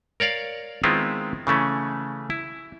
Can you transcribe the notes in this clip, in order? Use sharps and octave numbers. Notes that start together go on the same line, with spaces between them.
A#4 C#5 D5 F5
D#3 G#3 B3 C4 E4 F4
C#3 E3 A3 C#4
E4